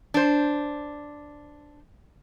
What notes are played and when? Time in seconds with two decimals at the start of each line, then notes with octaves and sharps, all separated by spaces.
0.14 D4 C5